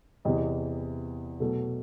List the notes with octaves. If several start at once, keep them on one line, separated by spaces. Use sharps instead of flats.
E2 C3 E3 D#5
B2 F#3 A3 A4